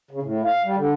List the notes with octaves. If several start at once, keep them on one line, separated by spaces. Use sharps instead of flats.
C#3
A2
F5
G3
D3